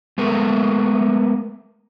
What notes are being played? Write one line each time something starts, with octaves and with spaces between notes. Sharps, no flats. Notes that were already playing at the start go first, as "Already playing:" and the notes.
G#3 A3 B3 A4 A#4